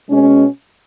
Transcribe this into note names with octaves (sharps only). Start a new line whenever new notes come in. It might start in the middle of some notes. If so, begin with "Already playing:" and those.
B2 G#3 C#4